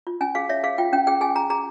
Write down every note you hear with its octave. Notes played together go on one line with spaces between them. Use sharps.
F4
C#4 G#5
G#4 F5
C#5 E5
G#4 F5
F4 G5
C#4 G5
G#4 G5
G#4 G#5
G#4 A#5
G#4 A#5